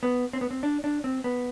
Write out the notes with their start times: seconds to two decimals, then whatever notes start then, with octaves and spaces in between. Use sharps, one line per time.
0.03 B3
0.33 C4
0.41 B3
0.51 C4
0.63 D4
0.84 D4
1.04 C4
1.24 B3